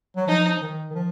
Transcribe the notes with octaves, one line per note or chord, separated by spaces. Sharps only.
F#3
F3 D#4
F3
D#3
D#3
F3